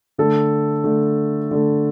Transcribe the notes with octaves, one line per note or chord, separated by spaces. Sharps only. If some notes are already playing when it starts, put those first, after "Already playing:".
D3 A3 A4
D3 A3
D3 A3